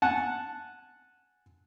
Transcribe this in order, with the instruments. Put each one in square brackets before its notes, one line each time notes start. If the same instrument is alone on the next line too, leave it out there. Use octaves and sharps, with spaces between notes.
[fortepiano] F#5 G#5 A5